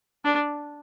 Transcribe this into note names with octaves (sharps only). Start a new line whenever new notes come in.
D4